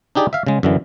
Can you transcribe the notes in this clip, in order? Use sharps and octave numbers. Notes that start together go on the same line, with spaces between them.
D4 D#4 G4 G#4 D5
E5 F5
C#3 G#3
F#2 D3 E3